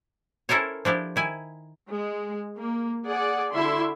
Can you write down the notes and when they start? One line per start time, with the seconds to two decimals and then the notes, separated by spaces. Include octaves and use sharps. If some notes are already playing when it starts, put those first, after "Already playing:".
0.49 C#4 E4 A4 A#4 C5 C#5
0.85 F3 D4 E4 G4
1.16 D#3 E4 G#5
1.91 G#3
2.59 A#3
3.06 G#4 D5 F#5
3.51 D3 E4 F#4 E5 C6